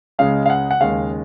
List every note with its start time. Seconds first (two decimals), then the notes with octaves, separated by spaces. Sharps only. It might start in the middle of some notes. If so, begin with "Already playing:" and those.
0.19 C#2 C#3 G#3 F5
0.46 F5
0.50 F#5
0.71 F#5
0.81 D#2 C#3 G#3 F5